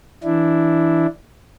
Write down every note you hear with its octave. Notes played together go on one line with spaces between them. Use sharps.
E3 D4 E4